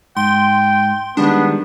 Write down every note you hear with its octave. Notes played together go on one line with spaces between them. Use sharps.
G#2 G5 C6
D#3 G3 G#3 B3 D4